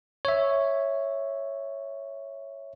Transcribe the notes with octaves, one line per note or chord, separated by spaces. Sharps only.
C#5 E5